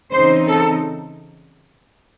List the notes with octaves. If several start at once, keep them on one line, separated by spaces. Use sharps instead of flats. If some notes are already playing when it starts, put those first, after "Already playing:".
C#3 E3 C4 D#4 C5
A4